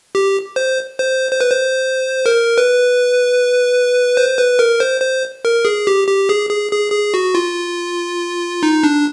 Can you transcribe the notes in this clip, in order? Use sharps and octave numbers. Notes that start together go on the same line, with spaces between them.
G4
C5
C5
C5
B4
C5
A#4
B4
C5
B4
A#4
C5
C5
A#4
G#4
G4
G4
G#4
G#4
G#4
G#4
F#4
F4
D#4
D4